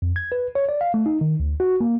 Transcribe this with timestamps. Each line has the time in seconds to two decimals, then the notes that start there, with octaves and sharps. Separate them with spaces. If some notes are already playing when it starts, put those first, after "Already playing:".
0.02 F2
0.16 G#6
0.32 B4
0.55 C#5
0.69 D5
0.81 F5
0.94 A3
1.06 D#4
1.21 D#3
1.40 D2
1.60 F#4
1.81 A#3